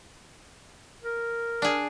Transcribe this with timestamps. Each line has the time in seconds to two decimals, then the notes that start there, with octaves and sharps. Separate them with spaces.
1.04 A#4
1.62 D4 G#4